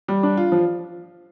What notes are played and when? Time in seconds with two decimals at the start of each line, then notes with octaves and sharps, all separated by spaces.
0.08 G3
0.23 D4
0.37 F4
0.52 F3